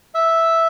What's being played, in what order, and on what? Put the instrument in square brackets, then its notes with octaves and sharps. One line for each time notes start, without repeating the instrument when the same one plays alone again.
[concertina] E5